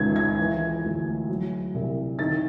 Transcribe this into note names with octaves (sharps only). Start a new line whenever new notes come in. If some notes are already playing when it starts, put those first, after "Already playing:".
Already playing: C#2 D#3 G#6
G#6
E3
D2
F#3
C2
D#3 A6